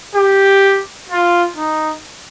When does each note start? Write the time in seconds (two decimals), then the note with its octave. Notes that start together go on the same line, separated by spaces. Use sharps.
0.15 G4
1.10 F4
1.56 D#4